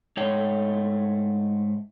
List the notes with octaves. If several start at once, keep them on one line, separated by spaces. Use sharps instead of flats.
G#2 A3 C#5 G5